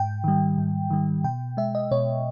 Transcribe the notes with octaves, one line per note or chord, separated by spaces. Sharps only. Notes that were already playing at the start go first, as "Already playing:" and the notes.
Already playing: G#2 G5
D#3 G3
G#2
D#3 G3
B2 G5
G#3 E5
D#5
B2 C#5